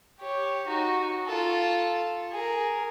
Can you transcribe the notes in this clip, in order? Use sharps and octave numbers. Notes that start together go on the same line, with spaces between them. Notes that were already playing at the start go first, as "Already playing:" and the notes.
G4 C#5
D#4 F#4
F4 A4
G#4 A#4